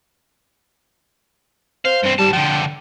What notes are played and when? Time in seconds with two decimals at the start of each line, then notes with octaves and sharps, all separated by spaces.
1.85 C5 F5
2.03 G2 C4
2.18 G#2 G3 A5
2.33 D3 F3 G5